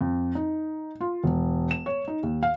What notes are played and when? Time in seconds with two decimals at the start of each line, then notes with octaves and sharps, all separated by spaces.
0.01 F2
0.35 D#4
1.01 F4
1.24 E1
1.71 E7
1.86 C#5
2.08 D#4
2.23 D#2
2.43 F5